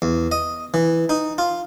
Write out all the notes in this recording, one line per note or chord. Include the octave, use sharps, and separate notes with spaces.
E2
D#5
E3
D#4
F4